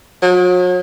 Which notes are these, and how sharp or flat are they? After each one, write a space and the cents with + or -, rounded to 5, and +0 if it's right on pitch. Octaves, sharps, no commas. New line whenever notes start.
F#3 -40